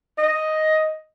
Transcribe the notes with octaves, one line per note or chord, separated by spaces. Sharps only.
D#5